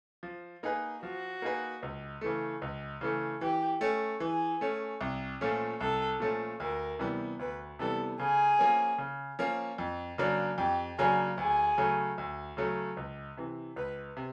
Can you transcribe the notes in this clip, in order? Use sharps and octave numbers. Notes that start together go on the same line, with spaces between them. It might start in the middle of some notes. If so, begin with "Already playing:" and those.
F3
A#3 D#4 G#4 B4
F3 F#4
A#3 D#4 G#4 B4
C#2
C#3 E3 A3
C#2
C#3 E3 A3
E3 G4
A3 C#4
E3 G#4
A3 C#4
C2
A#2 F3 A3 C#4
C2 A4
A#2 F3 A3 C#4
D2 A#4
C3 E3 G3 B3
D2 B4
C3 E3 G3 B3 A4
C#3 G#4
F3 A#3 C#4
C#3
F3 A#3 C#4
F2
C#3 F#3 A#3 D4
F2 G4
C#3 F#3 A#3 D4 G#4
D2 G#4
C#3 F#3 A3
D2
C#3 F#3 A3
C#2
C3 E3
C#2 B4
C3